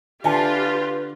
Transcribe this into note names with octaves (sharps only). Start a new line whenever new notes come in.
D3 F4 G4 B4 E5 G#5 A5